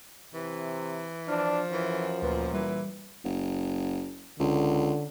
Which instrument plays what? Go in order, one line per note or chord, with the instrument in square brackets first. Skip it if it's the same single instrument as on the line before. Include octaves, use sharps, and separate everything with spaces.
[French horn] C3 [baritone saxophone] E3
[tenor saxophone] F3 [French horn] D4 [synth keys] F6
[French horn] F#2 [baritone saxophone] E3
[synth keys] D2 B4 [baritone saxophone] A#2
[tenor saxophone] E3 [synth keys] G3
[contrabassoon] F#1
[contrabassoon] C#2 [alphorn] D3